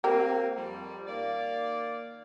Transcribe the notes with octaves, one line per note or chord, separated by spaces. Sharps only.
A#3 C4 G4 A#4
F2 G3
D#3 A#3 D5